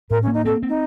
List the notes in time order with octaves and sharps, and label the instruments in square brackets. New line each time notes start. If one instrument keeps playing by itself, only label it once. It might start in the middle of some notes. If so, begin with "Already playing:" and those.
[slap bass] A2 [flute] A#4
[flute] C#4
[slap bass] A#3
[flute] D#4
[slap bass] C4 [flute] A4
[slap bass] C4
[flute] D#4